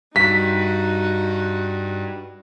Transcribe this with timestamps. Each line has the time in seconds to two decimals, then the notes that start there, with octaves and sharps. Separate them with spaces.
0.16 G2 D#4 F#4 B6